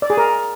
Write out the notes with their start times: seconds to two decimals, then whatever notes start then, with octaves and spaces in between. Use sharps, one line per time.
0.02 D5
0.10 G#4
0.17 A#4